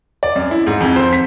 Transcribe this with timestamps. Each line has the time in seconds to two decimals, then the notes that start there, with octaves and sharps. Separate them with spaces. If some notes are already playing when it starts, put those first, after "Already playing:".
0.23 D5
0.36 F#2
0.51 E4
0.67 G#2
0.80 F2
0.96 C5
1.13 B6